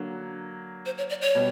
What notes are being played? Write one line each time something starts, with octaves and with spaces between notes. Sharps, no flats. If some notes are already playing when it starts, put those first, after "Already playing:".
Already playing: D3 F#3 A#3
C5
C#5
D5
C#5
B2 G3